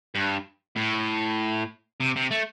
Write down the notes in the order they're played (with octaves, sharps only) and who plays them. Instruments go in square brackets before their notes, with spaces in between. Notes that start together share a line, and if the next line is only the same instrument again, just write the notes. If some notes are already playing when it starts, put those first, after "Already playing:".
[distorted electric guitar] G2
A2
C3
C3
A3